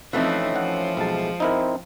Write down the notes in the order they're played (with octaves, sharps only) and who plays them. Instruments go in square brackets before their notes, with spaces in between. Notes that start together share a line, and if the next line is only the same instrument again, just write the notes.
[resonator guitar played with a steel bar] E3 A3 C4 [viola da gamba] F3 D#4 [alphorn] C#4
[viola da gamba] F3 [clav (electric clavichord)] F#5
[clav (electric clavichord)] B1 A5 [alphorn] G#3
[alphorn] C4 [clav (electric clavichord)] D#4 E4 A#4